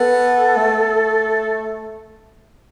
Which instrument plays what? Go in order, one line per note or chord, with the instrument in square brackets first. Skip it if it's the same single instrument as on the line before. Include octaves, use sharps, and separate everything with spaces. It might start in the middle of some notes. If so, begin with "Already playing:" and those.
Already playing: [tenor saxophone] B3 [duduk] A4
[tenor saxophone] A3